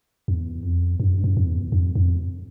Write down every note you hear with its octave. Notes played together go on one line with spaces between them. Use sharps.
E2
F2
F#2
G2
F#2
F2
E2
F2
F2